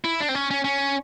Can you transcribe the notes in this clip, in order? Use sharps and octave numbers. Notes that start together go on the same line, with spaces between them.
E4
D4
C4
C#4
C#4
C#4